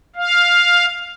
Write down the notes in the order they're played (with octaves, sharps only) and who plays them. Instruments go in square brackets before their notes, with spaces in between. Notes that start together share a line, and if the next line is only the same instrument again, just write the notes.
[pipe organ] F5